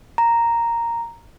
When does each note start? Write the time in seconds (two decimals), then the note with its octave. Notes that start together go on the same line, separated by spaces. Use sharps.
0.18 A#5